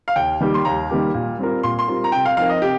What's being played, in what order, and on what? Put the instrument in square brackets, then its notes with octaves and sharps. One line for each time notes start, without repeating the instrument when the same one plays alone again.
[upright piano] F5
[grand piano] D#2 [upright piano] G5
[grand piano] D#3 G3 A#3 G4
[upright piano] C6
[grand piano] D#2 [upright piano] A#5
[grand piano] D#3 G3 A#3 G4
A#2
G3 C4 F4 A#4
[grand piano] A#2 [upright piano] C6
[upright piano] C6
[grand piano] G3 C4 F4 A#4
[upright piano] A#5
[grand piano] C3 [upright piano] G5
[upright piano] F5
[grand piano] F3 C4 D#4 A#4 [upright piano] F5
[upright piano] D#5
[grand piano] C3 [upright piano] G4